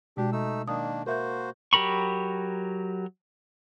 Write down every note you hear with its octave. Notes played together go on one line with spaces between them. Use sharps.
B2 G#3 D4 F#4 G4
A3 D#4 E6
D#3 A#3 D4 D#6
A#3 F#4 A#4 C5 E5 G6
F#3 G4 A#4 B5 C#6